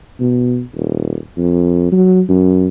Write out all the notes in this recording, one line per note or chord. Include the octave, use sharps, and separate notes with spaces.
B2
D#1
F2
F#3
F#2